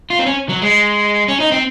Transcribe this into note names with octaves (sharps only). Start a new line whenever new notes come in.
F4
C4
C#4
F#3
G#3
C#4
D#4
C4